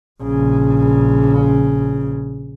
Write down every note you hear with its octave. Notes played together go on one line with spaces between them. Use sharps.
A#1 C#3